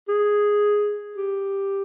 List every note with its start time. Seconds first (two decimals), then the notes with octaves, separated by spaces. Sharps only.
0.09 G#4
1.16 G4